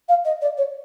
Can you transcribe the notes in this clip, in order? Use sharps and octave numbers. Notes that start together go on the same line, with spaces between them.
F5
D#5
D5
C#5